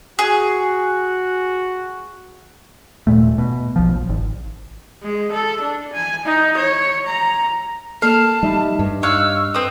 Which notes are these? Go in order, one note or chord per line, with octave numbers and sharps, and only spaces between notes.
F#4 G#4
D#1 G#1 A#2 A3
B2
B1 F3
A#1
G#1
G#3
A4
D4
G#5
D#4
C#5
A#5
A#3 A4 F5 A5
G3 D#4 E5 B5
G2
C#5 D#5 F5 E6 F#6
C4 B4 D#6